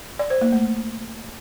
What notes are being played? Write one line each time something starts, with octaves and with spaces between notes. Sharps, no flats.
D5
C5
A#3
A3